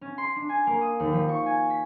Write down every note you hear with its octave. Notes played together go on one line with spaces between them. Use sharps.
C#4
C6
D4
G#5
A#3
D#6
D#2
F3
C#6
G#5
B6